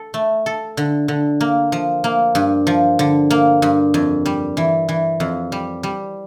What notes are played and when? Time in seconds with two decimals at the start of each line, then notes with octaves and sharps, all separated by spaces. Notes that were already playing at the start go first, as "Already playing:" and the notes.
Already playing: A4
0.14 A3
0.46 A4
0.77 D3
1.08 D3
1.41 A#3
1.72 F3
2.04 A#3
2.35 G2
2.67 F3
2.99 D3
3.30 A#3
3.62 G2
3.94 F2
4.26 G3
4.57 E3
4.89 E3
5.20 F2
5.52 G3
5.83 G3